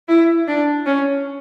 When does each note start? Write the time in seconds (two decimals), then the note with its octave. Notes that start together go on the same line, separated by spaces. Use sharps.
0.08 E4
0.48 D4
0.86 C#4